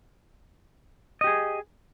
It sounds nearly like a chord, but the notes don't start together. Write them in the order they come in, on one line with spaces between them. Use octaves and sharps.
D#5 G4 G#4